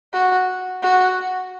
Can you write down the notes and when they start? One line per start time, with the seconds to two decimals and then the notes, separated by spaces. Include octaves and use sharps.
0.13 F#4
0.83 F#4